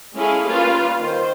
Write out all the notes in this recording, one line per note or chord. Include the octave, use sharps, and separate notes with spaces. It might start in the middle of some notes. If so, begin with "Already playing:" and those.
G#3 C#4 E4 G#4 A4 F5
G3 A#3 C#4 F4 B4 F5
D#3 C5